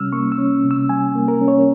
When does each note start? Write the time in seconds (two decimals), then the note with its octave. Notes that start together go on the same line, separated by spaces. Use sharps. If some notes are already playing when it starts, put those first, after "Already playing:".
Already playing: C3 G3 C#4 E6 F6
0.12 A#3 C#6
0.32 E6
0.38 C#4
0.64 C3
0.71 E6
0.89 G3 G#5
1.15 A#3
1.28 A#4
1.41 C#4
1.48 C#5